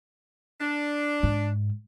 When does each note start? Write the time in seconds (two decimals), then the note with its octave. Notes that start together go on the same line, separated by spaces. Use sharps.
0.60 D4
1.23 G#2